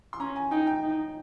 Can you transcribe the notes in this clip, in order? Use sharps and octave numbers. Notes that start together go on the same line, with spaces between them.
C6
C#4 A#5
G#5
D#4 G5
G5
D#4